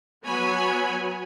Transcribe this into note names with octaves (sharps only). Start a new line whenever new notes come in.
F#3 B3 C#5 G#5 B5